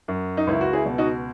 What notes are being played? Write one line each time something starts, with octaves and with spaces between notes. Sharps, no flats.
F#2
D#4
C#2 E4
F#4
E4 G#4
B2
D#4 F#4